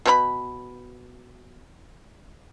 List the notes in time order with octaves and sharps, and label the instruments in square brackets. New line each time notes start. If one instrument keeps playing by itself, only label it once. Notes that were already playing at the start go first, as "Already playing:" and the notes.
[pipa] B2 C4 B5